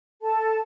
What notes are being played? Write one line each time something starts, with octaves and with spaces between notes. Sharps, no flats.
A4 A5